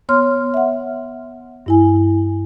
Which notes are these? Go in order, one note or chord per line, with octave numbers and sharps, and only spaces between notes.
B3 C#5 C6 F6
E5 F#5
G2 E4 G#5